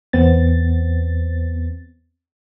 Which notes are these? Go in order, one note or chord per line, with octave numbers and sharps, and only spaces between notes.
E2 B3 C4 A6